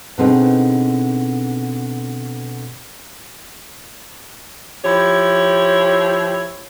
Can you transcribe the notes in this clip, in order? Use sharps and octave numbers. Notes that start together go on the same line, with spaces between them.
B2 D3 C4 D#4 G#4 B4
F3 E4 G4 C#5